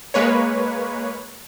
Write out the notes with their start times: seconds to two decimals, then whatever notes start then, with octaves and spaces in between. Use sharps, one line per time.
0.14 G#3 A#3 B4 C#5